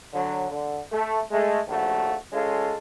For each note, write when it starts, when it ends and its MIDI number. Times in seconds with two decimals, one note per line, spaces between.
0.14 0.46 50
0.14 0.46 54
0.49 0.79 50
0.92 1.20 57
1.31 1.59 56
1.31 1.59 57
1.67 2.15 34
1.67 2.15 39
1.67 2.15 53
1.67 2.15 57
1.67 2.15 66
2.32 2.76 56
2.32 2.76 61
2.32 2.76 65
2.32 2.76 69